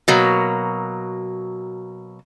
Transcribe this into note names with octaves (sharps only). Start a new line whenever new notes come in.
B2 F#3 A#3